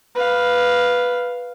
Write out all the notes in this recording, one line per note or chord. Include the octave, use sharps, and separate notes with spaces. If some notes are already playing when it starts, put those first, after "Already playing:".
B4 F5